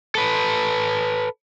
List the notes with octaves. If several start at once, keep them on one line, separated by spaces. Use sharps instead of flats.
A4 B4